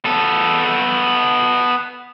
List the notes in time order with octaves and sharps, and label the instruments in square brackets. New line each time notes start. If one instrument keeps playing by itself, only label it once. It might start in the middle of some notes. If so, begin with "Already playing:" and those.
[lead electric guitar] B3 A4